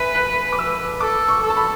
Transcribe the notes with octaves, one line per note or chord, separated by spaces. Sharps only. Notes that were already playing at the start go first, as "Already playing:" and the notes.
Already playing: B4 E5 G#5
F#6
D6
E6
A4 D6
C#6
A4
A5
B5